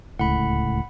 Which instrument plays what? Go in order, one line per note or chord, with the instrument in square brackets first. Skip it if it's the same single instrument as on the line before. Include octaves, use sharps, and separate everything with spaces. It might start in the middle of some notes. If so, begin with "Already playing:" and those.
[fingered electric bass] D1 C#2 A2 [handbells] F#5 B5